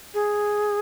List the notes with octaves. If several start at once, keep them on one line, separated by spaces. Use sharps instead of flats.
G#4